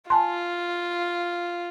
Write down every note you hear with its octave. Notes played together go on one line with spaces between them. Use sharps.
F4 G#5 A5 C6